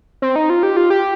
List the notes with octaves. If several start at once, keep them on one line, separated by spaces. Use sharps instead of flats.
C4
D#4
F4
G4
F4
G4